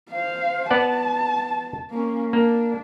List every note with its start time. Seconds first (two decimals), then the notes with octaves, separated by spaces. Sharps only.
0.11 C5 F5
0.70 B3 D5 F#5 A5
1.91 A#3 C#4
2.33 A#3 D4